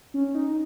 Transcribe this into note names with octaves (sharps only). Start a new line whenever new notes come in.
C#4
D#4